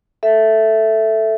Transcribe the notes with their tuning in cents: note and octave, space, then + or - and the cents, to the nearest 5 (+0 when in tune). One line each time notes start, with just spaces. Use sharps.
A4 +0 E5 +0